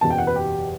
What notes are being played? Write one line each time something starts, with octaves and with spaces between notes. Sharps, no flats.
F#1 E2 B2 A5
G5
F#5
B4
G4